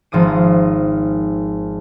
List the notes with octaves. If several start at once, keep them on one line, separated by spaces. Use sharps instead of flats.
G#1 F3 D#6 D#7